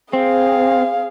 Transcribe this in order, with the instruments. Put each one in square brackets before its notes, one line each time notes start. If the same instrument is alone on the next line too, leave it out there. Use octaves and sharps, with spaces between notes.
[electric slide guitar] C4 [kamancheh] G#4 F5